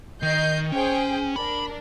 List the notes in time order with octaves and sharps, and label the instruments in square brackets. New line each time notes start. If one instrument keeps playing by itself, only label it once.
[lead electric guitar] D#3 [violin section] D#5 G6 C7
[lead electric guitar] C#4 [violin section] G#4 C5 G5
[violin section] D4 A#4 [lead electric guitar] B5